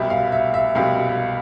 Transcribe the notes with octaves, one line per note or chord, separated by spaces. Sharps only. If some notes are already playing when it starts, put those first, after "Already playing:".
Already playing: C2 B2 G3 E5
F5
E5
E5
C2 B2 G3 F5